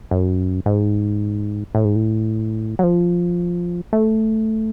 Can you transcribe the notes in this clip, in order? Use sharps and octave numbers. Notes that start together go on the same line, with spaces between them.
F#2
G#2
A2
G#2
A2
F#3
F3
A3